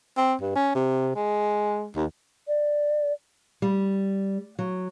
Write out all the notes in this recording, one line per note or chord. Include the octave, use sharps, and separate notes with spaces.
C4
G2
C#4
C3
G#3
D#2
D5
G3
F#3